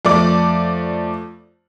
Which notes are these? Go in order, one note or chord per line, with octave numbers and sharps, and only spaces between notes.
F2 A3 D5 D6